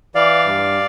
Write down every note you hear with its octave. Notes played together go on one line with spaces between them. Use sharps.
E3 D5 F5
G2